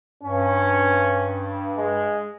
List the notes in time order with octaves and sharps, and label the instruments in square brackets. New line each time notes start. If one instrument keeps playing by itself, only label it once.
[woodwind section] G2 [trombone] C#4
[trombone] G#3